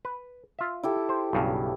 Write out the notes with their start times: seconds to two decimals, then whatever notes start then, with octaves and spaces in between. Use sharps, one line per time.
0.05 B4
0.59 F4 E5
0.83 E4 G4 A4
1.09 C5
1.33 B1 G2 C#3